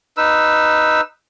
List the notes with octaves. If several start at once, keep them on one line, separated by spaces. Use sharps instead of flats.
D#4 B4 E6